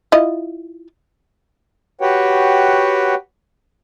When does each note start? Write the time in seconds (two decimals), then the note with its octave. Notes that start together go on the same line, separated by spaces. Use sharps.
0.12 E4 F4 D#5
2.01 F#4 G4 B4 C#5 F#5 G5